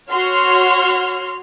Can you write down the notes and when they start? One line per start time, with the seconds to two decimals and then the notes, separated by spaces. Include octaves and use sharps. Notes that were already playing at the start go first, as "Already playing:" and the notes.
0.11 F#4 C#5 C6 F6